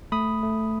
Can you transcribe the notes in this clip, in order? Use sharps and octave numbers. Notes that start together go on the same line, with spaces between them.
A3 B5 D#6
A3